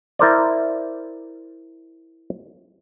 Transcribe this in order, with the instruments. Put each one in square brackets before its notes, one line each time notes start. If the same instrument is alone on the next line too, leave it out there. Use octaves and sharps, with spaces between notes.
[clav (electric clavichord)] E4 A#4 C5 D5